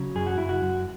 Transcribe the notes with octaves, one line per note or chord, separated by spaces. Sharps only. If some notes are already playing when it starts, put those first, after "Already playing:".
Already playing: C#3 F#3
F#2 G#4
F#4
F#2 E4
F#4
F#2